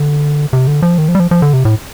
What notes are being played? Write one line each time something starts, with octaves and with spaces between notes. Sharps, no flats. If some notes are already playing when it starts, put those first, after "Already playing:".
Already playing: D3
C3
D3
F3
D#3
F3
G3
F3
F3
D3
C3
A2